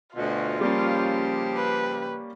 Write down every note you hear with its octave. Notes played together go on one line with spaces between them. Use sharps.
D2 B2 F4
C#3 F3 G3 A#3 C#4 G4
B4